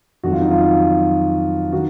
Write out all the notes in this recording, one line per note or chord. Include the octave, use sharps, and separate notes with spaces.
F2 D#3 F#3 F#4
F4
D#4
F4
D#3 F#4